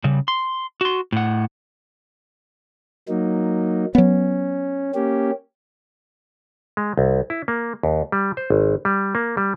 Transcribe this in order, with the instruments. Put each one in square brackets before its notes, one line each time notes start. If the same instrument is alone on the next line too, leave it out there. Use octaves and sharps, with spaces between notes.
[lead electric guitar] C#3 G3
C6
F#4 C6
A2 F#5
[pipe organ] F#3 A#3 D#4
[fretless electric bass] F#3 B3 [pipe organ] C#4
[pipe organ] A#3 C#4 G4
[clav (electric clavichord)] G#3
C2
E4
A#3
D#2
G3
C5
G#1
G3
A#3
G3